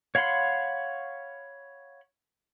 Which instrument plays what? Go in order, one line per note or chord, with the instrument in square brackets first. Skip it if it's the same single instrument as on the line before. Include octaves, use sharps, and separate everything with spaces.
[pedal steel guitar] C#5 F5 F#5 B5 C6